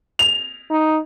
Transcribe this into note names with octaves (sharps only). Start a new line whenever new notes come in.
F7
D#4